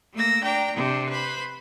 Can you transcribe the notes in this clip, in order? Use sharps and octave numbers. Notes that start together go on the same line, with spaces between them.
A3 A#3 E6 A#6
D4 G5 A#5
C3 C4 D4
B4 C5 B5